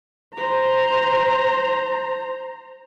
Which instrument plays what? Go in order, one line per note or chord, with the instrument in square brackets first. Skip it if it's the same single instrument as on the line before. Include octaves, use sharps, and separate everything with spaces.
[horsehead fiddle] C5 A#5